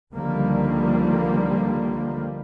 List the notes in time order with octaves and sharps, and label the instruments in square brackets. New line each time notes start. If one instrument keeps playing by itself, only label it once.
[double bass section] C#2 D3 D#3 F3 G3 A#3